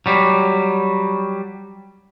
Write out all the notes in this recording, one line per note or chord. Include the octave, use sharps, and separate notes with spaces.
F#3 G3